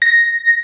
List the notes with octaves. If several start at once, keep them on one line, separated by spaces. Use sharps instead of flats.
A#6